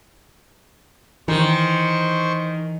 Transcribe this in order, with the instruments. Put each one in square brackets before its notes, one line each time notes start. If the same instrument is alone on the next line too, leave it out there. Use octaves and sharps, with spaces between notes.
[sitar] D#3 [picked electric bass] E3 [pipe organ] C5 C#6